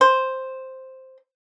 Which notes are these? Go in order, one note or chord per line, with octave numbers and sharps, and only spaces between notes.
C5